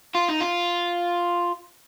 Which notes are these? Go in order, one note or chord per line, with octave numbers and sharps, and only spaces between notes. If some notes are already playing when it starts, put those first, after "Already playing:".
F4
D#4
F4